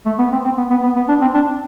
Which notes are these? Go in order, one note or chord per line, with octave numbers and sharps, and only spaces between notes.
A3
B3
C4
C4
B3
B3
B3
B3
D4
C4
D4